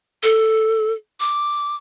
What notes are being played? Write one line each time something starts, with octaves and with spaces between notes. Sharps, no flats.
A4
D6